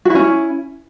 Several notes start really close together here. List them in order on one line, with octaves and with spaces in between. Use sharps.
F#4 E4 C#4